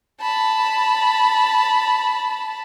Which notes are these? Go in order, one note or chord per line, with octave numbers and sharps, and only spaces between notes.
A5 B5